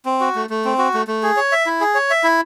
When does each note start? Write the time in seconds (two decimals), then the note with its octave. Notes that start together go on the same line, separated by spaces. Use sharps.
0.06 C4
0.20 F#4
0.35 A3
0.50 A3
0.65 C4
0.78 F#4
0.94 A3
1.07 A3
1.23 G#4
1.37 C#5
1.52 E5
1.66 E4
1.81 G#4
1.95 C#5
2.10 E5
2.24 E4